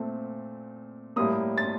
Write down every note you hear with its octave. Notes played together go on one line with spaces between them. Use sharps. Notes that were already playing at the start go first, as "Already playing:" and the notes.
Already playing: A#2 A3 C4
A2 G3 A#3 D#6
A6